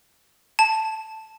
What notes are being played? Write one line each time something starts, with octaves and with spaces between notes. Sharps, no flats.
A5